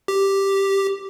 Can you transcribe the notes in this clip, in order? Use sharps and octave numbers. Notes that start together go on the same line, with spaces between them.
G4